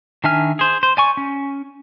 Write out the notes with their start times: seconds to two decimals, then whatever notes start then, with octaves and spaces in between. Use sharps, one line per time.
0.24 D#3 D4 E5 G#5 F6
0.59 G#4 C5
0.83 C5
0.97 D5 G#5 C#6
1.17 C#4